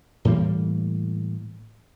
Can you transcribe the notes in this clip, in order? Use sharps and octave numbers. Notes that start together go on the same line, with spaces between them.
A2 E3 G3 A#3